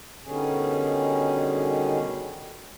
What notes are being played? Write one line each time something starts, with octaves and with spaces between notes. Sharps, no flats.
B2 D3 D#3 G3 C#4 G#4